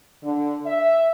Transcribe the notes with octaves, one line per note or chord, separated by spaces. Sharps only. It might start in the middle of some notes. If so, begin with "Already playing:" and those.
D3
E5